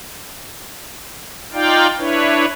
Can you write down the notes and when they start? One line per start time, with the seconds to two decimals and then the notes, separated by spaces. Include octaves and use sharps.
1.53 D#4 F4 D5 F5 G5
1.98 D4 E4 B4 C#5